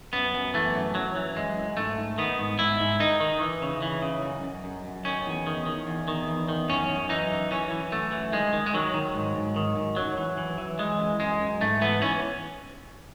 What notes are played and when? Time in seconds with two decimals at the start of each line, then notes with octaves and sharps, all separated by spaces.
0.13 F#2 B3
0.34 F#2
0.54 E3 A3
0.74 F#2
0.95 F#2 F#3
1.16 E3
1.36 F#2 G#3
1.56 F#2
1.77 G#2 A3
1.98 G#2
2.18 D#3 B3
2.39 G#2
2.59 G#2 E4
2.80 G#2
3.00 D#3 D#4
3.20 D#3
3.41 E3
3.62 C#3
3.82 E3
4.02 C#3
4.23 F#2
4.43 F#2
4.64 F#2
4.85 F#2
5.05 D#3 C#4
5.26 E2
5.47 D#3
5.66 D#3
5.87 E2
6.08 D#3
6.28 E2
6.49 D#3
6.69 F#2 C#4
6.89 F#2
7.09 E3 D#4
7.30 F#2
7.51 E3 C#4
7.71 E3
7.91 F#2 A3
8.12 E3
8.33 D#3 G#3
8.53 D#3
8.66 G#3
8.74 D#3 F#3
8.94 D#3
9.15 G#2
9.35 G#2
9.56 D#3
9.76 G#2
9.96 F#2 F#3
10.17 E3
10.38 E3
10.58 E3
10.79 E3 G#3
10.99 F#2
11.19 F#2 G#3
11.40 F#2
11.61 G#2 A3
11.81 E3 B3
12.01 E3 C#4